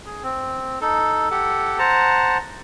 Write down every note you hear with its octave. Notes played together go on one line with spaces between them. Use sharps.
G#4
C4
D#4 A4
G4 A4 F#5
C5 F#5 A5 A#5